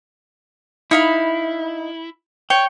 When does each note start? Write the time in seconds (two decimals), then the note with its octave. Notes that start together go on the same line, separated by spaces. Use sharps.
0.91 D#4 E4 F5 B5
2.50 C#5 G5